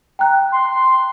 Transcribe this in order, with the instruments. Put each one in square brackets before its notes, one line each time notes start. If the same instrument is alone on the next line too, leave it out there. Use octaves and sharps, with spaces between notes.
[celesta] G5 A#5 F#6
[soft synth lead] C6